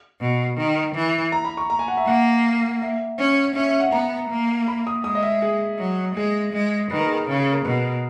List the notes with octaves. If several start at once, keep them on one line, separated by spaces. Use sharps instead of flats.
B2
D#3
E3
A#5
B5
C#6
A#5
G#5
F#5
E5
A#3 F#5
E5
C#4
C#4 E5
E5
F#5
B3 A#5
A#3
B5
D#6
G#3 D#6
D#5
E5
G#4
F#3
G#3 G#4
G#3
D#3 B4
A#4
G#4
A#4
C#3
G#4
A#4
B2 B4